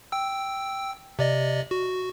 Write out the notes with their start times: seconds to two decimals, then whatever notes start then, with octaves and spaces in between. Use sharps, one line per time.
0.12 G5 E6
1.19 C3 D5 D#5
1.71 F#4